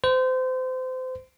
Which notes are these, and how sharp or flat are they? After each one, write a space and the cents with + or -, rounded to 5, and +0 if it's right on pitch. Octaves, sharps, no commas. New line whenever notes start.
C5 -30